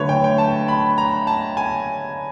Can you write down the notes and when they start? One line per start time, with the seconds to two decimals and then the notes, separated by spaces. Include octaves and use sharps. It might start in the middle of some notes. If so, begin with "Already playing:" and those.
Already playing: D3 F#3 A3 B4 C#5
0.09 G5
0.24 G5
0.38 A5
0.68 B5
0.98 A#5
1.27 A5
1.57 G#5